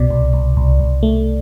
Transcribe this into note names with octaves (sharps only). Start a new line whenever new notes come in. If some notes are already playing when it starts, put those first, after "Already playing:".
Already playing: C2 B2 D5
C2
C2
C2
C2
A3